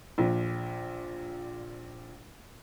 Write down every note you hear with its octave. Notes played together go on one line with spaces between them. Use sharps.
A#1 A#2